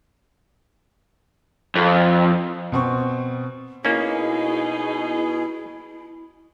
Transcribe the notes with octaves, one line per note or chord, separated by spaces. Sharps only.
F2
B2 C4 C#6
B2 A#3 C#4 D#4 E4 G#4